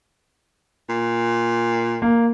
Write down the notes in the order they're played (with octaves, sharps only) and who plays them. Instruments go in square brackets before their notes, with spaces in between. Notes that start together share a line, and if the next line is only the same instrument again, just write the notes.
[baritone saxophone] A#2
[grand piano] A#3